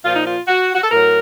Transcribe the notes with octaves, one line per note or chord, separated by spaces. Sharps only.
A#2 F3 F4
D#4
F4
F#4
F#4
A4
A2 F#3 A#4